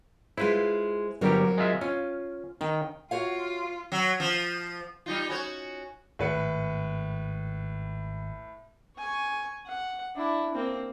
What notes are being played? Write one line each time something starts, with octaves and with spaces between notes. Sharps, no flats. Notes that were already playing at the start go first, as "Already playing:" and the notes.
G#3 E4 F4 B4 C5
G1 F#3 G3 C4 G4 A#4
G#3 F4 E5
C#4 F4
D#3 G5
F4 F#4 C#5 F5
F#3
F3
G3 D#4 F4
C#4 F#4 C#5
G#1 A2 B4 C#7
G#5 C#6
F#5
D4 E4
A#3 C4